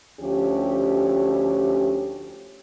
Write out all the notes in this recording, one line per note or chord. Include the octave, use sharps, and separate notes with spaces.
D2 F3 C#4 G4